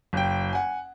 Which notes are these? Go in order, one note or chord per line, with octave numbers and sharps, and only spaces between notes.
F#1 G5
F#5 G#5